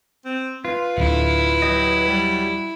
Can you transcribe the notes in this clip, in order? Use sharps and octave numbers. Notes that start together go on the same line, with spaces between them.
C4
F4 B4
D1 D3 E4
F#3 G4 D#5
G3